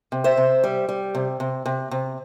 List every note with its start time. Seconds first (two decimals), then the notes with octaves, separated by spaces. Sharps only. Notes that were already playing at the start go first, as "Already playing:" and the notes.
0.12 C3
0.24 C5 E5
0.37 C3
0.64 G3
0.89 G3
1.15 C3
1.40 C3
1.66 C3
1.91 C3